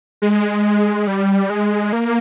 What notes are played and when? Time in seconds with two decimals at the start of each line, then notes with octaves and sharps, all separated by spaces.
0.22 G#3
1.07 G3
1.50 G#3
1.93 A#3